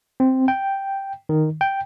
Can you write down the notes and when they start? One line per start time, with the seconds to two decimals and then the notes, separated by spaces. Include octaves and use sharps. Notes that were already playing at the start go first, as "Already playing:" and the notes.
0.20 C4
0.48 G5
1.29 D#3
1.61 G5